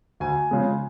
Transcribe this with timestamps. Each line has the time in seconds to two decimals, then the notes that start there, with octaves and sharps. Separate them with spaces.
0.20 D2 G#5
0.51 C#3 F3 G#3